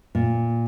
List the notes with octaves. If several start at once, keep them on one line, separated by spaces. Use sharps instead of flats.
A#2